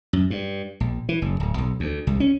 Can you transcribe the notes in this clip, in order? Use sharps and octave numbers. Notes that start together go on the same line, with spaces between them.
F#2
G2
A#1
E3
F#1
D1
B1
D2
C2
C#4